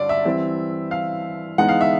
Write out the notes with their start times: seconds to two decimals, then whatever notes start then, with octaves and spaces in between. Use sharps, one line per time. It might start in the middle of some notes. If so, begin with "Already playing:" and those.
Already playing: G2 D3 D5
0.09 E5
0.25 E3 G3 C4
0.91 F5
1.58 E3 G#3 B3 D#4 F#5
1.69 F5
1.81 E5